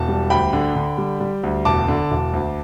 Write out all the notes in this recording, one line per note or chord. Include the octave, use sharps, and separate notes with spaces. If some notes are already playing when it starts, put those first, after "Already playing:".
Already playing: E1 A5
G3
D2 G5 B5
D3
D3
G3
G3
D2
E1 A5 D6
D3
E1
D2